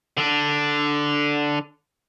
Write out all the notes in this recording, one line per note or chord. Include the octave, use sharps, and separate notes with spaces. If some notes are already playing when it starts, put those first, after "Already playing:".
D3 D4